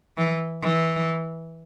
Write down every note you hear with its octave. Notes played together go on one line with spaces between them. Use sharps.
E3
E3